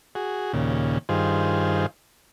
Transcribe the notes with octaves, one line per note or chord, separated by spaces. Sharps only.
F#4 G#4
D#2 A#2 C#3
G2 D#3 F4 G#4 C5